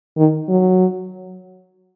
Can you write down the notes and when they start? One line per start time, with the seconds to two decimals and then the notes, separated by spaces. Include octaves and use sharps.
0.17 D#3
0.49 F#3